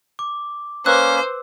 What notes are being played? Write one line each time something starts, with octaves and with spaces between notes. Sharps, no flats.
D6
A#3 C#4 B4 C5 E6 F#6